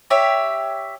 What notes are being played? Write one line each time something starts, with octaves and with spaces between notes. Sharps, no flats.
G4 C#5 E5